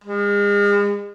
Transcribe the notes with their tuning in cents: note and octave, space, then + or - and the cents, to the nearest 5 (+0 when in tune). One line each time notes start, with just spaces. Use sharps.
G#3 -40